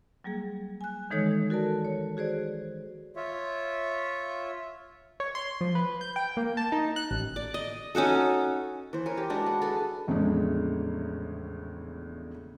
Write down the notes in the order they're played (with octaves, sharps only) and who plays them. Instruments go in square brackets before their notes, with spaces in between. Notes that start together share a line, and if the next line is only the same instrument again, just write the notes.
[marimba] F#3 G3 A#3 G#4
G#5 F#6
D#3 E3 G#3 D#4 A4 C#5
F#4 A4 A#4 D5 A5
C#5
F#4 G#4 C5 D5
[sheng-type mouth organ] F4 C#5 E5
[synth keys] C#5
C6
F3
B4
G6
G5
A#3
A5
D#4
F#6
A1
[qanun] D5
D#5
C#4 D#4 F#4 A4
E3 C5
A#4 C#5 G#5
G4
G#3 D4 F#4
B4
G#4 A4
[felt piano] A#1 E2 A2 C#3 G#3